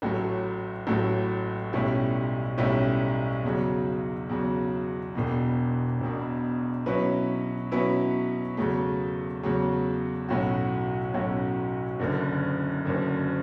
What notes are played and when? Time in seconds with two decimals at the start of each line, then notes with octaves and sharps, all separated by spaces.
0.02 A1 A2 F#3 A3
0.87 A1 A2 F#3 A3
1.73 B1 A2 G3 C#4 E4
2.58 B1 A2 G3 C#4 E4
3.43 E2 C#3 F#3
4.29 E2 C#3 F#3
5.15 E1 E2 B2
6.00 E1 E2 B2
6.86 B2 F#3 C#4 E4 B4
7.71 B2 F#3 C#4 E4 B4
8.57 E2 C#3 F#3 A3
9.43 E2 C#3 F#3 A3
10.28 B1 A2 F#3 C#4 F#4
11.14 B1 A2 F#3 C#4 F#4
11.99 F#1 F#2 D3
12.85 F#1 F#2 D3